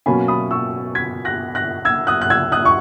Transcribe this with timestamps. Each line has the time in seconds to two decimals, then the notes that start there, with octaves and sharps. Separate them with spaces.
0.06 B2 F#3 A#3 C#4 G#5 B5
0.28 B5 D#6
0.51 C#6 E6
0.95 G#6 B6
1.25 F#6 A#6
1.55 F#6 A#6
1.85 E6 G#6
2.07 D#6 F#6
2.21 F#6
2.30 E6 G#6
2.52 D#6 F#6
2.65 C#6